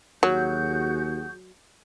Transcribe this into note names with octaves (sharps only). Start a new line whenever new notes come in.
D#2 F#3 F#4 G#4 G6